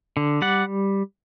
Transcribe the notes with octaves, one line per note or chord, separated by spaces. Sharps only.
D3
G3 D5 F#5